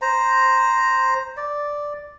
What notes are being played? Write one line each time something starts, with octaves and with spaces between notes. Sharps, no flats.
C5 A#5
D5